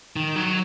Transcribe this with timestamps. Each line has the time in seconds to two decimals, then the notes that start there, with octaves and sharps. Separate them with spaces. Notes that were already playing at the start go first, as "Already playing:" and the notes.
0.16 D#3
0.36 F#3